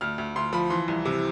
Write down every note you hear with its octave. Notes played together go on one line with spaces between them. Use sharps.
D2 F6
D2
D2 C6
F3 B5
E3 C6
C2
C3